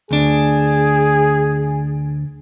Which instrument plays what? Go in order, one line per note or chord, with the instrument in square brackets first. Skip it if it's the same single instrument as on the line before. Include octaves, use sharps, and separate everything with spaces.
[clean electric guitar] D2 D4 [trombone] G#4